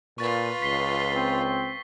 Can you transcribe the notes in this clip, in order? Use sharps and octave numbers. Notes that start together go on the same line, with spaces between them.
A#2 F4 B4 C#6 A6
C#2 B6 C7 G7
C4